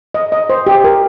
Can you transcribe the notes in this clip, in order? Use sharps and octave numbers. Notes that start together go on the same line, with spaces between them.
D#5
D#5
C5
G4
A#4